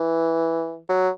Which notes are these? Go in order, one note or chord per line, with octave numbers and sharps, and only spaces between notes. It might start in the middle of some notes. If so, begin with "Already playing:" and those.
Already playing: E3
F#3